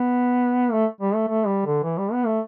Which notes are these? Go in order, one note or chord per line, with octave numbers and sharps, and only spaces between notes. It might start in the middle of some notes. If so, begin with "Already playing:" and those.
Already playing: B3
A3
G3
A3
A3
G3
D3
E3
G3
B3
A3